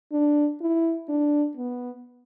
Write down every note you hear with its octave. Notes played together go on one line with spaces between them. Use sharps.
D4
E4
D4
B3